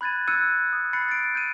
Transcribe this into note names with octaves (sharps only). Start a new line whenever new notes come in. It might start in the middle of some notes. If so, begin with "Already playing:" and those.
B5 F#6 G#6 A6 D#7
E6 F#6 G#6 C#7 D#7
D#6
B5 F#6 A6 C7 C#7
A6 D7
G6 D#7